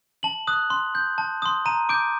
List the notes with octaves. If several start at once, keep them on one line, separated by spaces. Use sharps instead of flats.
A5 F#7
D#6 F#6
C6
G6
A5
C6 D#6
A#5 D#7
D6 G6 D7